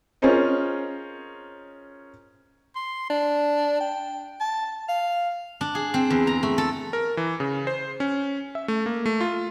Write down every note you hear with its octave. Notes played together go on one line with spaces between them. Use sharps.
C#4 F4 G#4 A#4 C5 D#5
C6
D4
G5
A5
F5
D4
G#4
C4
E2
A#5
A3
A4
A#4
E3
C#3
C5
C#4
E5
A3
A#3
A3
F4